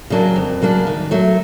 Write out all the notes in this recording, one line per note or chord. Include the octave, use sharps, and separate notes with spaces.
C#3 F#3 A#3 D4
F2
C#3 F#3 A#3 D4
D#3
F#3 A3